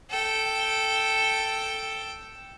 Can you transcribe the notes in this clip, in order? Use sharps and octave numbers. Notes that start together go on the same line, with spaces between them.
A4 G5